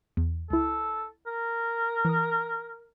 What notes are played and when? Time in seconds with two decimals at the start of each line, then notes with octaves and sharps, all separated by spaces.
0.17 E2
0.50 C#2 E4 A4
1.27 A#4
2.05 E3 D#6